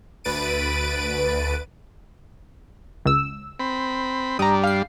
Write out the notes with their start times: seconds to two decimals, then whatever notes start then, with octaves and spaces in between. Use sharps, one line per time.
0.24 D2 B4 A6 D7 D#7
3.05 C#2 E6
3.60 C4 B5
4.39 G2 G3 D4 A#5 D#6
4.64 F5 C7